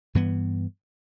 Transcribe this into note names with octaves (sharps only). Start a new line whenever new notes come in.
G2 E3 B3